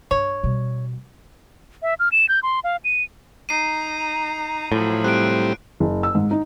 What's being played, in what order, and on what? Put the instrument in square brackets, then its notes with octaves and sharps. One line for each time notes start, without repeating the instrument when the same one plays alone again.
[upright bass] G2 [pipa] C#5
[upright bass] B2 G3
[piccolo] E5
F6
E7
G6
C6
F5
D#7
[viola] D#4 A#5 [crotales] C7 D#7
[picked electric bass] A2 [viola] F3 F#3
[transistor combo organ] G3 C4 [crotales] F#6 D7
[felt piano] F#1
E6
G#2
D#4